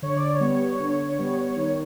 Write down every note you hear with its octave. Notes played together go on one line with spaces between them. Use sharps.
D3 C#5
D5
C#5
G3 B3
D3
G3 B3
D#3